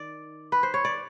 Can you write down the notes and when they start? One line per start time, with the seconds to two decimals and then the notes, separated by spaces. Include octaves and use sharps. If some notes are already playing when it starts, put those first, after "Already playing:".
Already playing: D#3 D5
0.52 B4
0.63 C5
0.74 C#5
0.85 D5